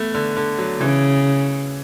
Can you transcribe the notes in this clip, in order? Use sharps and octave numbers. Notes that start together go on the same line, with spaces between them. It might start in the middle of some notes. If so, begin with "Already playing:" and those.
Already playing: A3 B3
D3
D3
F#3
C#3 E3